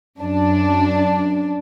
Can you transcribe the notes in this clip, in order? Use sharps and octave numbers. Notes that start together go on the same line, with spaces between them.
F#2 D4